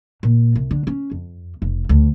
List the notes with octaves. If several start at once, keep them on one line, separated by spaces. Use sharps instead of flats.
A#2
C2
D3
C#4
F2
F1
D2